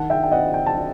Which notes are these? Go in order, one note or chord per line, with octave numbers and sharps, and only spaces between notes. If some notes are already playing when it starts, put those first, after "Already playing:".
Already playing: D#3 F#5 A5
E5 G5
G5
C4 D#5 F#5
G5
A5
D#3